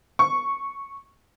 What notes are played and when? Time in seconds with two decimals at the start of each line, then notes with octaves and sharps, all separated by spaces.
0.19 C#6